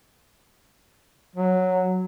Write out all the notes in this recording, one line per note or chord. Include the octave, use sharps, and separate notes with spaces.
F#3